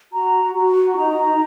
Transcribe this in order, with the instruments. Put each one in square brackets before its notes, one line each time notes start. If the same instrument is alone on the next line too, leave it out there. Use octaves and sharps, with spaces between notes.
[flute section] F#4 A#5
F#4
D#4 A#5